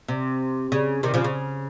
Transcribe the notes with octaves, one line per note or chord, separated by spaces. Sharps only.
C3
C#3
C3 D#3
C#3 F3
C#3